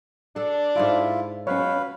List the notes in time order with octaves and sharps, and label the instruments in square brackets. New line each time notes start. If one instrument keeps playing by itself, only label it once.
[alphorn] D4 [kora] A4 F#5
[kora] G#2 A4 D5 [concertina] E4 F4
[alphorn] B2 [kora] F#3 F4 [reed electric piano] C#4 C#5 [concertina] B4 F5